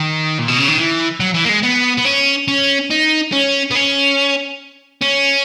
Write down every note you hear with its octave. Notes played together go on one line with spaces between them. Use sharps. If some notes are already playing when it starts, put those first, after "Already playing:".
Already playing: D#3
A#2
B2
C#3
D#3
E3
F#3
E3
A#3
G#3
B3
B3
C#4
C#4
D#4
C#4
B3
C#4
C#4